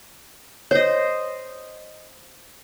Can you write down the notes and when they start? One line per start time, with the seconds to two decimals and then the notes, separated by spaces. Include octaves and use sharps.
0.71 C5 C#5 D#5